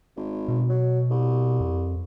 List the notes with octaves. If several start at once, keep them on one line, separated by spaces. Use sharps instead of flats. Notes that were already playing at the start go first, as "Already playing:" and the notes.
G#1
B2
F#3
C2
F2